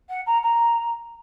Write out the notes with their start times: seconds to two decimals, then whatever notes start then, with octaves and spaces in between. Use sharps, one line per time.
0.09 F#5
0.26 A#5
0.43 A#5